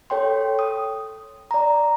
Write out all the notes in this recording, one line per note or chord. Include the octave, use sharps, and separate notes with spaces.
A4 C#5 G5 C6
D#6
D5 A#5